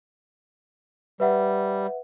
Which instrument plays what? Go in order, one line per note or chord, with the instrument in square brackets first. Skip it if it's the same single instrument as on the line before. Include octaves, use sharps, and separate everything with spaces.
[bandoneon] G3 [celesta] B4 E5 F#5